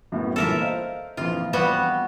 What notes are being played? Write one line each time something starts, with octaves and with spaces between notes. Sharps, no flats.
F#2 A2 B3
G1 A#2 E3 A4 A#4 E5
C5 D#5 F5
A#1 F2 E3 F4
G3 B3 F#4